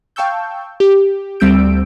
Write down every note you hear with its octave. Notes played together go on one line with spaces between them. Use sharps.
F5 G5 A5 C#6 E6 G6
G4
D2 G3 C4 E6 G6 D7